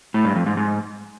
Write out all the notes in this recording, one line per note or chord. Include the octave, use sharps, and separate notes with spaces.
A2
G2
F2
G#2
G#2